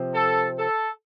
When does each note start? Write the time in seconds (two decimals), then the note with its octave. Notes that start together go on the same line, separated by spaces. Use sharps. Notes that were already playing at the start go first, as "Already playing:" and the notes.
Already playing: C3 F3 C4
0.14 A4
0.57 A4